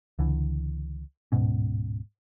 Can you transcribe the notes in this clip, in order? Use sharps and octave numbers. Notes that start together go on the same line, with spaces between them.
C#2 D3 E3
D1 G#2 B2 C#4